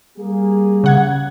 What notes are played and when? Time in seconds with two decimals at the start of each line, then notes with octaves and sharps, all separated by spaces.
0.17 G3 A#3 G#4
0.84 C#3 F#5 G#6